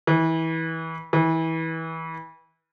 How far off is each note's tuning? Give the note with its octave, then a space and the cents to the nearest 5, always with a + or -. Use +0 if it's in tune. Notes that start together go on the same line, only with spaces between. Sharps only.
E3 -25
E3 -25